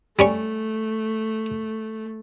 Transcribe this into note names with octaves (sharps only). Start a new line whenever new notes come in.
G3 A3 C#4 C#6